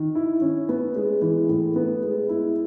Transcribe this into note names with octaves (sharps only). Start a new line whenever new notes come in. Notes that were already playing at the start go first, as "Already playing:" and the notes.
Already playing: D#3
E4
C#4
B3
G#3
E3
A2
B3
G#3
E4